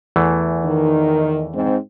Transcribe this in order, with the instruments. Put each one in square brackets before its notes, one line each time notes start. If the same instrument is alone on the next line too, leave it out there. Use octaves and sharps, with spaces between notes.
[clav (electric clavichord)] E2 E3 A3
[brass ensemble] D#3
G#2 C4